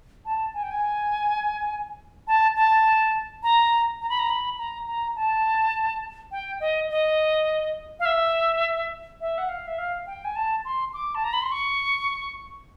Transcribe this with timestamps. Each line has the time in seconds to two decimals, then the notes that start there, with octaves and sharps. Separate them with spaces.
0.25 A5
0.54 G#5
0.63 G5
0.71 G#5
2.27 A5
2.56 A5
3.43 A#5
4.01 A#5
4.09 B5
4.19 A#5
4.30 B5
4.58 A#5
4.87 A#5
5.16 A5
6.31 G5
6.60 D#5
6.90 D#5
7.99 F5
8.05 E5
9.21 E5
9.38 F#5
9.49 F5
9.67 E5
9.78 F5
10.07 G5
10.24 G#5
10.36 A5
10.65 C6
10.93 D6
11.15 A5
11.24 A#5
11.33 B5
11.42 C6
11.52 C#6